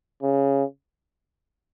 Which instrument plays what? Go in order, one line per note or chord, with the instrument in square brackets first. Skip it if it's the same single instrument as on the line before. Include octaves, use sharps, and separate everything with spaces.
[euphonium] C#3